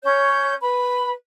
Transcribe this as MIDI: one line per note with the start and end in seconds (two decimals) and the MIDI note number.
0.03 0.53 61
0.03 0.53 73
0.03 0.53 91
0.60 1.12 71
0.60 1.12 83